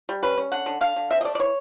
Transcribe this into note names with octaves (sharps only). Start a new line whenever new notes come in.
G3
C#4 B4
C#4
D3 F#5
D3
D3 F5
D3
C4 E5
D#5
A3 D5
D5
E3 C#5